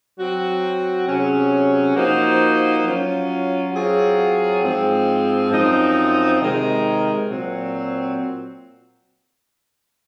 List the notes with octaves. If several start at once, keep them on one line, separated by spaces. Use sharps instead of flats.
F#3 C4 F#4
C3 F#3 C#4 G#4
F3 A#3 D#4 F#4 C5
F#3 C#4 F4
F#3 C4 F4 G#4 C#5
G#2 F3 G#3 C4
F#2 F3 C4 D#4
C3 D#3 G#3 D#4 A#4
A#2 F#3 C4